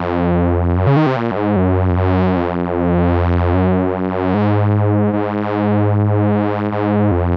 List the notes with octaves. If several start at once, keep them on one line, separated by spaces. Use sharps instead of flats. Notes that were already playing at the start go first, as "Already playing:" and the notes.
Already playing: F2
F#2
C#3
D#3
C3
A#2
F#2
G#2
F#2
F2
F#2
F2
F#2
G#2
G#2
G#2
F2